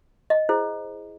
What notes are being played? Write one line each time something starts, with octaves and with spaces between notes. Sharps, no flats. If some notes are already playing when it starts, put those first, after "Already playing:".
D#5
E4 G#4 C5